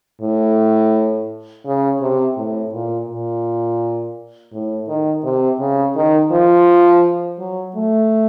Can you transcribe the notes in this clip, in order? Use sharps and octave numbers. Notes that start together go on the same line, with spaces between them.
A2
C#3
C3
A2
A#2
A#2
A2
D#3
C3
C#3
D#3
F3
F#3
A3